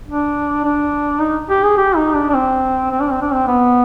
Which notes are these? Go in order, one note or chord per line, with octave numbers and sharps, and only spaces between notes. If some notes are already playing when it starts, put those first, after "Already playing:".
D4
D4
D#4
G4
G#4
G4
D#4
D4
D4
C4
C4
D4
C4
D4
C4
B3